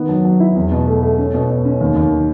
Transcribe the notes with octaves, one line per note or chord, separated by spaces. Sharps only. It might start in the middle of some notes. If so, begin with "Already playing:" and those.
Already playing: D#3 B3
F#3
F#3
E4
E2
B2
A3
A3
C#4
B2
B2
C#4
D#2
D#2
D#3